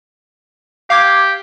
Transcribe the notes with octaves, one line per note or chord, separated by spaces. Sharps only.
G4 F5 D6 G#6